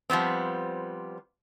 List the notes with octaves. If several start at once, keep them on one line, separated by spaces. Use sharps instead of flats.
F3 G3 B3 C4